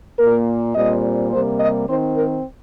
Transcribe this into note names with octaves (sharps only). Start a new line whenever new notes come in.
A#2 A#3 A#4
A#2 G3 C4 D#5
C3 G3 A#3 C5
D#5
D#3 C4 C5
A#4